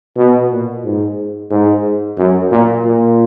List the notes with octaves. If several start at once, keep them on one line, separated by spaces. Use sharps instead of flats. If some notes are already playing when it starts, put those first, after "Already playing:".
B2
A#2
G#2
G#2
F#2
A#2
A#2